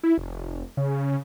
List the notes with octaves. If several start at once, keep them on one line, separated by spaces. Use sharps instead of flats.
E4
F1
C#3